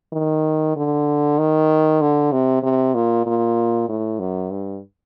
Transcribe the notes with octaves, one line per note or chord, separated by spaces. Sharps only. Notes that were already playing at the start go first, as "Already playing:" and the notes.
D#3
D3
D#3
D3
C3
C3
A#2
A#2
A2
F#2
G2